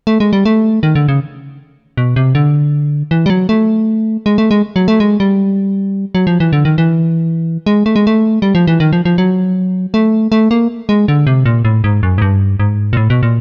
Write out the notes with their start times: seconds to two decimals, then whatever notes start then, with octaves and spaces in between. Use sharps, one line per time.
0.07 A3
0.20 G#3
0.33 G3
0.45 A3
0.83 D#3
0.95 D3
1.08 C#3
1.97 B2
2.16 C3
2.35 D3
3.11 E3
3.26 G3
3.30 F#3
3.49 A3
4.26 G#3
4.38 A3
4.51 G#3
4.76 F#3
4.88 A3
5.00 G#3
5.20 G3
6.15 F#3
6.27 F3
6.40 E3
6.53 D3
6.65 D#3
6.78 E3
7.66 G#3
7.86 A3
7.96 G#3
8.07 A3
8.42 G3
8.55 F3
8.67 E3
8.80 D#3
8.93 F3
9.05 F3
9.18 F#3
9.94 A3
10.32 A3
10.51 A#3
10.89 G#3
11.08 D3
11.27 C3
11.46 A#2
11.65 A2
11.84 G#2
12.03 F#2
12.18 G#2
12.22 G2
12.60 G#2
12.93 A#2
12.97 A2
13.10 B2
13.23 A#2